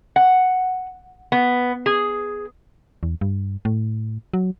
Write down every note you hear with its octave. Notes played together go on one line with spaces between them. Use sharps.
F#5
B3
G#4
E2
G2
A2
F#3